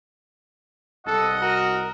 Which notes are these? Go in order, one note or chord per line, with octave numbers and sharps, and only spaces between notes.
C2 A4 D#5 F#5
F#4 A#4